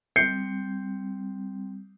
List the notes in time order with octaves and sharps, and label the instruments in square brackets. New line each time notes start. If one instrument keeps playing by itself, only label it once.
[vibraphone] G3 C4 [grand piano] G6 C7 C#7